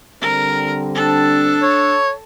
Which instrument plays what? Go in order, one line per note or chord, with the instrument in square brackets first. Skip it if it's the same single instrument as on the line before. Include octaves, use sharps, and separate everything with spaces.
[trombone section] D3 G3 C4 [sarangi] A#4
[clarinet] D4 [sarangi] A4
[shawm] C#5